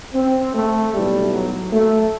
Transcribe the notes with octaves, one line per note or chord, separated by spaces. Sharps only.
C4
A3
B1 A2 E3 G3
F#3
A3